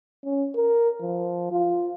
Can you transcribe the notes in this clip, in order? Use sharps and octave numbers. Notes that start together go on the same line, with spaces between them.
C#4
A#4
F3
F4